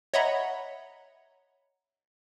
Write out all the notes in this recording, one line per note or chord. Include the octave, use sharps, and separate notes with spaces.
C#5 D#5 E5 F#5 A#5 B5